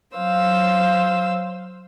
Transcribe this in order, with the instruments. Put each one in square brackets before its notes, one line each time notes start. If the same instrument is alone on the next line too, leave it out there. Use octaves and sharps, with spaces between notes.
[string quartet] F#3 C5 F5 E6